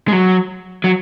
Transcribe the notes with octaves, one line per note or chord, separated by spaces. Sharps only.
G#3
F#3
F#3